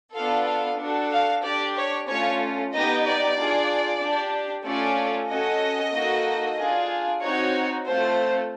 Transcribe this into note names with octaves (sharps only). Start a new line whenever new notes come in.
B3 D4 F4 A4 F5
F5
D4 F#4 A4
F5
D4 G4 D5
C#5
A3 C#4 F4 C#5
B3 D#4 G4 D#5
D5
D4 F4 G#4
D4
G4
A3 C#4 F4 A4 D5
C#4 F#4 A4 D#5
A#3 D#4 F#4 A4
D4 F4 G#4
C4 D#4 F#4 C#5
A3 C4 F4 A4 C5